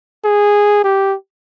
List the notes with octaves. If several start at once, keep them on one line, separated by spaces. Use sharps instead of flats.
G#4
G4